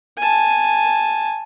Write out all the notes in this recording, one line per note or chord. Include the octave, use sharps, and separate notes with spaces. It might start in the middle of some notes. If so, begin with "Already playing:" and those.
G#5 A5